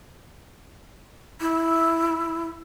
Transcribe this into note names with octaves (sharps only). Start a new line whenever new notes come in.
E4